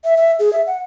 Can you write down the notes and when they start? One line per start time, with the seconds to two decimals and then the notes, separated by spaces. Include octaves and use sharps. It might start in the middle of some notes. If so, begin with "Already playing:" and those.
0.04 E5
0.17 E5
0.39 G#4
0.53 E5
0.67 F#5